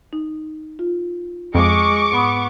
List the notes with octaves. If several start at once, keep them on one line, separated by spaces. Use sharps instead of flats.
D#4
F4
F2 G#3 C#6 D6
G#2 B3 B5 D#6